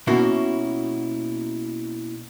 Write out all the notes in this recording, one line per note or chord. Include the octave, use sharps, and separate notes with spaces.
B2 A#3 C#4 E4 F#4